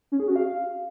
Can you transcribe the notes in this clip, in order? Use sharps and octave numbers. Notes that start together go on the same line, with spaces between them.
C#4
G#4
F#4
F5